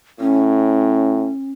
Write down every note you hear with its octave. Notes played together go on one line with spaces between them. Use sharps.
A2 C#4